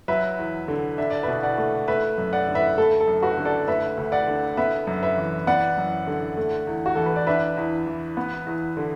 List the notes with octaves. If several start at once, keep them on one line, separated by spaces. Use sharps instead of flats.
F#3 B4 E5
E2
D3
D4 E5
D5
B2 B4 E5
D5 F#5
A3
A3 B4 E5
F#2
D5 F#5
D3
B4 E5
A3 A4
A4
F#2
F#4 B4
D3
A4 D5
A3 B4 E5
D2
D5 F#5
D3
B3 B4 E5
F#2
B4 E5
E3
B3 D5 F#5
F#2
D3
A3
E2
F#4
E3 A4
B4
D5
D4 B4 E5
E2
E3
B3
E2
D3